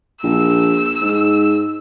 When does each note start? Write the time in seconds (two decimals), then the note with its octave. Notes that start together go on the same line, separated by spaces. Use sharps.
0.24 A#1 E6
1.01 G#2